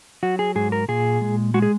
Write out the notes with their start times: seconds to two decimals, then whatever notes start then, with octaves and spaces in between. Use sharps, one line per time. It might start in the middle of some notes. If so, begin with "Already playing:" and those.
0.23 F#3 F#4
0.39 G#4
0.55 G#2 G#4
0.72 A#4
0.88 A#2 G#4
1.21 G#3
1.54 G#3 F#4
1.62 G#4